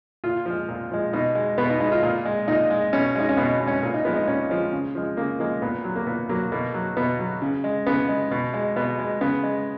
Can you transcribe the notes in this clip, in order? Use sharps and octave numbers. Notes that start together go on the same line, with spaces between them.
A#2 F4
F3 G#3
A#2
F3 G#3
B2 D#4
G#3
B2 B3
D#4
G#3 D#4
F4
A#2
G#3
A#2 D#4
G#3
B2 C#4
G#3 D#4
C#4
B2 B3
G#3
C#4
A#2
D#4
F3 G#3 B3
D#4
A#2 C#4
F3 G#3
C#3
F3 G#3
C#3 A#3
F3 G#3 A#3
A#2 B3
F#3
A#3
A#2 B3
F#3 A#3
B2 A#3
F#3
B2 B3
F#3
C#3
G#3
C#3 B3
G#3
B2
G#3
B2 B3
G#3
C#3 B3
G#3